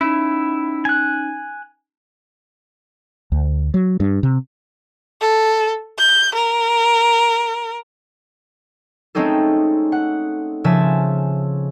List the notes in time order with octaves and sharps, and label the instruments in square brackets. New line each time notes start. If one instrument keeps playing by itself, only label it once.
[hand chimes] C#4 D#4 [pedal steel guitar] E4
[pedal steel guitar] G#5 F#6
[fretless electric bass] D2
F#3
G2
C3
[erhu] A4
G6
A#4
[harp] G#3 A3 C4 C#4 D#4 A4
F#5
C#3 F3 E5 G#5 A5